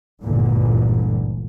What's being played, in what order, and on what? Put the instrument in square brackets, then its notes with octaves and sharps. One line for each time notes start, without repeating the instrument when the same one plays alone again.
[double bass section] G1 C#2 F#2 A#2 D3 E3